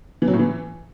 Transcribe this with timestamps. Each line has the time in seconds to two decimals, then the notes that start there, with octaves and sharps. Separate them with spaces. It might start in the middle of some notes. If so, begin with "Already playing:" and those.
0.22 E3
0.28 F#3
0.33 A2
0.39 E3